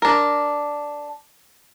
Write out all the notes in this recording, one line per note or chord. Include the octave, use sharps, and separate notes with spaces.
D4 A#4